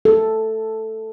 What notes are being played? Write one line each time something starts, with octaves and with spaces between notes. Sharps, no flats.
A4